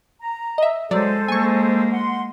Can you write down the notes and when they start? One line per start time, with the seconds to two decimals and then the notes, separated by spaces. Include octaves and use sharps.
0.20 A#5
0.58 D#5 E5
0.91 F#3 G#3 A4 C5 D5
1.28 G#3 A#3 G#5 C#6
1.91 F#5 C6